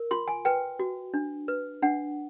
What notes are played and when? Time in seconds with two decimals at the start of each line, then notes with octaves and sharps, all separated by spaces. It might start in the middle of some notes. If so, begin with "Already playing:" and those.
Already playing: A#4
0.11 F4 C6
0.28 G#5
0.45 B4 G5
0.79 F#4
1.14 D4
1.48 B4
1.82 D4 F#5